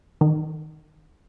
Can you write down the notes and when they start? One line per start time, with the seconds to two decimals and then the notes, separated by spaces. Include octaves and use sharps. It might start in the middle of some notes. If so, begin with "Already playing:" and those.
0.21 D#3